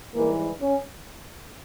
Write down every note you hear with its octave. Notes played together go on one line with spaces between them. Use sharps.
G#2 E3 G3 A#3
C#4